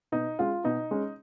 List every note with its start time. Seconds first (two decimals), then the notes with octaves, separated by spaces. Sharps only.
0.12 B2 D#4
0.39 G#3 C#4 F4
0.64 B2 D#4
0.91 G#3 C#4